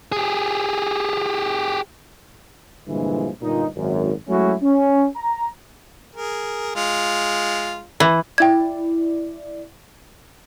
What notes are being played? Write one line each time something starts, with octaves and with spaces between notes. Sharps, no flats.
G4 G#4
G2 A#2 D3 E3 F3 G#3
G1 A#2 D#4
G#1 F#2
F#3 G#3 A3 C#4 E4 F#4
C#4
A#5
G#4 A#4
G#3 F4
E3
E4 D5 G5 G#6